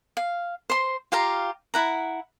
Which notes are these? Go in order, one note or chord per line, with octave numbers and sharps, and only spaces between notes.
F5
C5 C6
F4 G4 F5 A#5
E4 F#5 A#5